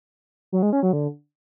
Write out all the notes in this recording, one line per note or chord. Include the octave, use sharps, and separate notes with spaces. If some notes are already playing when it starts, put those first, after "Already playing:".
F#3
G#3
C#4
F#3
D3